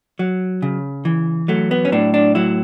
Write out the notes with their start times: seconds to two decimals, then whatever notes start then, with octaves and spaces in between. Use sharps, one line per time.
0.19 F#3
0.62 C#3
1.05 E3
1.48 F#3 A3
1.71 B3
1.85 C#4
1.92 A2 D4
2.14 D4
2.35 F#3 E4